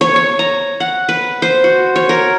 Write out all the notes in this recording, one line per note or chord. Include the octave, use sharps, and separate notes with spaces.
C#5
C#5
A#5
F#5
B4
C5
F#4
C#5
A#4